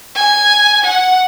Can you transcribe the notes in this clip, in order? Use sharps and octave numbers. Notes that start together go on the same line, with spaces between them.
G#5
F#5